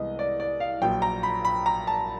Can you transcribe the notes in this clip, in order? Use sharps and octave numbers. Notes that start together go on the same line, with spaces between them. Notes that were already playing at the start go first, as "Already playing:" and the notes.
Already playing: C2 C3 E3 G#3 B3 D#5
D5
D5
F5
A#1 A#2 F#3 G5
A#5
B5
B5
A#5
A5